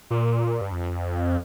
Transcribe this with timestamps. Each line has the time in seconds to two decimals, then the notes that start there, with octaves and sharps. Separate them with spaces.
0.10 A#2
0.61 G2
0.72 F2